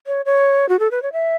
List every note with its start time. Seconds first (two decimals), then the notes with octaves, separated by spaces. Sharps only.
0.07 C#5
0.26 C#5
0.69 F#4
0.79 A4
0.91 B4
1.03 C#5
1.13 E5